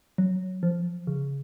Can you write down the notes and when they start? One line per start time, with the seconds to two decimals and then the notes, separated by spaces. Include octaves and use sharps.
0.18 F#3
0.63 F3
1.07 C#3